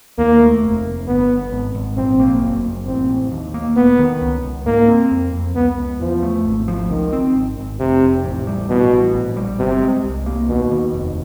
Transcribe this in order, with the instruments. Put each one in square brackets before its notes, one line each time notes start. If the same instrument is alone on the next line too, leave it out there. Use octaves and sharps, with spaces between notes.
[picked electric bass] D#2 [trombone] A#3
[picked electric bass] A3
F1
F1
[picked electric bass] G1 [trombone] B3
[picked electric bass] G1
G#1
G#1
[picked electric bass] A#1 [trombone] C4
[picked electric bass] A#3
F#1
F#1
[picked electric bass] A1 [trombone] C4
[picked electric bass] A1
D#2
A#3
[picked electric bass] E1 [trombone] B3
[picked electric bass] D#3
C#2
C#2
[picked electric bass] G#2 [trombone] A#3
[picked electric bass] C4
F2
F2
[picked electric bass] C#2 [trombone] B3
[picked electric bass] C#2
[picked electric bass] E2 [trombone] F3
[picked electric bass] A3
G#1
F3
[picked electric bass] C#2 [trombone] D#3
[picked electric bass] C4
G#1
G#1
[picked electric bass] F1 [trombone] C3
[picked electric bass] F1
A1
G3
[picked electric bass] A1 [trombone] B2
[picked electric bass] A1
A#1
G3
[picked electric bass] G1 [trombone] C3
[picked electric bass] G#3
C2
A#3
[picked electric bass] D#2 [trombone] B2
[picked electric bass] D#2
F1